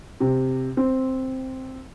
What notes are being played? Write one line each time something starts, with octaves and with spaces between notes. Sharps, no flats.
C3
C4